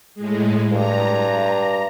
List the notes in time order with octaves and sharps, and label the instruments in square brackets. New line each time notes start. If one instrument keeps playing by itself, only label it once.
[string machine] A2 G#3
[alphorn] G2 [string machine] A#5